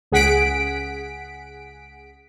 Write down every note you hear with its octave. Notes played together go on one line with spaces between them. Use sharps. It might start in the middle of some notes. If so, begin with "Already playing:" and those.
C#2 G#4 F#5 B6 D7